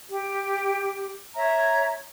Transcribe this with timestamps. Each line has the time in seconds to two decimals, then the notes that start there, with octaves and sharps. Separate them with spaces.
0.10 G4
1.34 C#5 E5 A#5